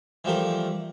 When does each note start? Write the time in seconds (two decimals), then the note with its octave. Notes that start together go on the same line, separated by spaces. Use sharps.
0.24 E3 F3 G3 A3 A#4